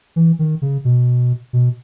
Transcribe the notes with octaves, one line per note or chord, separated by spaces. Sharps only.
E3
D#3
C#3
B2
B2